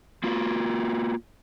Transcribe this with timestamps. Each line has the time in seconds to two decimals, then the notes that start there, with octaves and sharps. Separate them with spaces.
0.24 A#3 F4 F#4